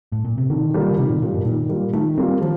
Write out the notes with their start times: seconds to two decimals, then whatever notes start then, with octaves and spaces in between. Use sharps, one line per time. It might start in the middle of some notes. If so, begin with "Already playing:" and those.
0.12 A2
0.25 A#2
0.38 C3
0.50 D3 D#3
0.74 G3 A#3 F4
0.91 D3
0.98 C3 D#3
1.10 A#2
1.22 A#2 G3 A#3 F4
1.34 G2
1.45 A#2 D#3
1.69 G3 A#3 F4
1.93 D#3 A3
2.18 G3 A#3 C4 F4
2.42 F3